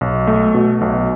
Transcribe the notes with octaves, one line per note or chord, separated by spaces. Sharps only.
B1
A3
B2
B1